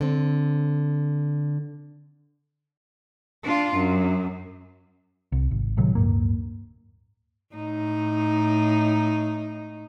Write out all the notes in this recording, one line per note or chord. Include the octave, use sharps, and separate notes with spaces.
D3 C4
D4 F4
F#2
C2
G#1
A2 C3 D#3 F#3
D1 C#2 G2 A#3
A2 D#4